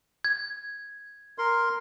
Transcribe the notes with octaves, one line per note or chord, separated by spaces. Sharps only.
G#6
A#4 C6